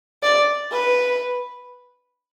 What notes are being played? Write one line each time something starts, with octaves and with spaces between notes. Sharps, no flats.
D5
B4